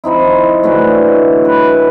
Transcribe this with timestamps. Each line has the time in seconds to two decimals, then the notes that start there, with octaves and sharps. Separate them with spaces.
0.04 F3 C4 D#4 E4
0.63 D3 E3 F#3 A3
1.45 B4